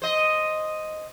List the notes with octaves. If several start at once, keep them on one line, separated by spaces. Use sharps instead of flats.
C5 D#5